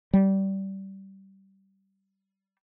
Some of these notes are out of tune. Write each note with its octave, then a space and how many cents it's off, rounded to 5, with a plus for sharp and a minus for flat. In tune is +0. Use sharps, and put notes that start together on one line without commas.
G3 -20